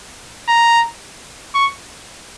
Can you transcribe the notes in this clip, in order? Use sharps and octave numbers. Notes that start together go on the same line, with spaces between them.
A#5
C#6